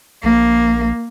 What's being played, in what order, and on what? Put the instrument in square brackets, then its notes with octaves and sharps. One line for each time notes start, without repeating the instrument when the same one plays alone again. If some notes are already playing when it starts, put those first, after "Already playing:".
[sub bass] A#1 [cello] A#3